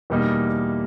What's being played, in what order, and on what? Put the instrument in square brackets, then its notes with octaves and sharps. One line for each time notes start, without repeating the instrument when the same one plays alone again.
[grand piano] E2 B2 G3 A#3 D#4